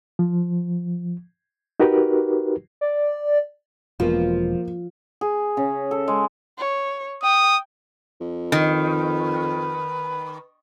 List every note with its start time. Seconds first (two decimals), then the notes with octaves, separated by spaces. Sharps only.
0.19 F3
1.80 D#4 F#4 G4 A#4 B4
2.81 D5
4.00 E1 B2 F3 A#3 F4
5.21 G#4
5.57 C#3
5.91 A4
6.08 G#3
6.58 C#5
7.23 G5 D#6
8.21 F2
8.52 D#3 B4